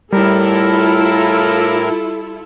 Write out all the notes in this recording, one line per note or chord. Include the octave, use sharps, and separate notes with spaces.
A2 G3 E4 F4 A4 A#4